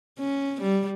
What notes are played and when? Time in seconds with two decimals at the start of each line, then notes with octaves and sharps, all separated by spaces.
0.19 C#4
0.62 G3